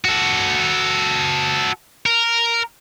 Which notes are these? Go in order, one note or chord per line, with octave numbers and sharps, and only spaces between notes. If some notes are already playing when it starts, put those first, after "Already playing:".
F#4 A4
A#4